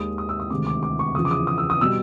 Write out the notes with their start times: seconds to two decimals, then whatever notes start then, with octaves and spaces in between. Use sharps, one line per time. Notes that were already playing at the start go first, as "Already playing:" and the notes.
Already playing: D#2 D#3 G#3 D#6
0.18 D#6
0.29 E6
0.40 D#6
0.50 D2 C3 D#3 G#3 D6
0.67 D6
0.83 D6
0.99 C#6
1.15 E2 C#3 F3 D#6
1.25 D6
1.31 D#6
1.47 D#6
1.58 E6
1.70 D#6
1.81 B2 G3 E6